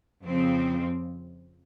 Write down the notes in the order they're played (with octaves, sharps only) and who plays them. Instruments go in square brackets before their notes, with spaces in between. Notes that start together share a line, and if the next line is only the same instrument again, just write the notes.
[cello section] F2 C#3 F3 C4